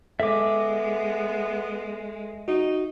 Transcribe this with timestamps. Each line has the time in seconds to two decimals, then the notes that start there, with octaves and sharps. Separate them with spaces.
0.20 G#3 B3 A4 E5 D6
2.48 D#4 F#4